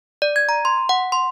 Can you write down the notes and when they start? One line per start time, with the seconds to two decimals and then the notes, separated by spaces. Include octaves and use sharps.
0.22 D5
0.36 G#6
0.49 A#5
0.65 C6
0.89 F#5
1.12 C6